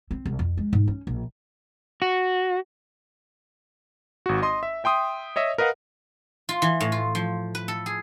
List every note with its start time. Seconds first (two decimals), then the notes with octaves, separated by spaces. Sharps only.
0.11 C4
0.26 C2
0.39 F2
0.57 G#3
0.73 G#2
0.88 C#4
1.07 A#1
2.02 F#4
4.26 G#1 F#4
4.42 D#5 C6 D#6
4.63 E5
4.84 E5 G5 C6 D#6
5.36 C#5 D#5 E5
5.58 A#4 B4 D#5 F5 F#5
6.49 F4
6.62 E3
6.80 A2
6.92 F4
7.15 F3
7.55 B4
7.68 A4
7.86 G#4